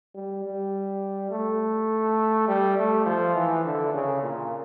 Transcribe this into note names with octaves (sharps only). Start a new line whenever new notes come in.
G3
G3
A3
G3
A3
F3
E3
D3
C#3
A#2